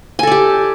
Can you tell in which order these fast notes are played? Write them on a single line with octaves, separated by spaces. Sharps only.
G#5 A4 D5 G4